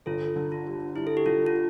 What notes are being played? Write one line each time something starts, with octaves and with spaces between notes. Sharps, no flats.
G1 F4 A4
D3
F4
G3
G3 E4
A4
G4
D3 F4
F4